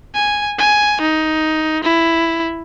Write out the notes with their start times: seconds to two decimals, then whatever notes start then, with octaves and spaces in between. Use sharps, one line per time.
0.14 G#5
0.58 G#5
1.01 D#4
1.83 E4